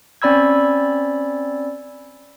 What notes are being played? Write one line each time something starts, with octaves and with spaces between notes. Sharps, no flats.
C4 C#4 D5 B5 E6 G#6